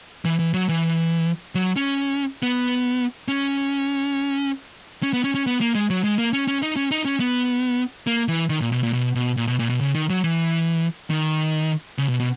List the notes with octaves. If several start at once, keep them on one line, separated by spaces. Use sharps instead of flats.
E3
E3
F#3
E3
F#3
C#4
B3
C#4
C#4
B3
C#4
C#4
B3
A#3
G#3
F#3
G#3
A#3
C#4
C#4
D#4
C#4
D#4
C#4
B3
A#3
E3
D#3
A#2
B2
A#2
B2
B2
A#2
B2
A#2
B2
C#3
D#3
F#3
E3
D#3
C#3
B2
B2